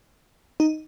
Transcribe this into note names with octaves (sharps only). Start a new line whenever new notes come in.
D#4